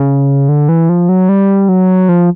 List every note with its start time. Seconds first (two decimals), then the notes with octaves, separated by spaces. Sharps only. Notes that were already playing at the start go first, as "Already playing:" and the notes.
Already playing: C#3
0.49 D3
0.69 E3
0.89 F3
1.09 F#3
1.29 G3
1.69 F#3
2.09 F3